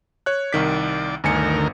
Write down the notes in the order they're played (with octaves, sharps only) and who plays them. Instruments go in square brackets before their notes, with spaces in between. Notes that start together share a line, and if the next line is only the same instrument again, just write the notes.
[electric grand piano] C#5 F#6
[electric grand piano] C2 D#3 B6 [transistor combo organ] D5
[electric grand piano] G1 G#5 C#7 [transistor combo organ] D2 D#3 A#4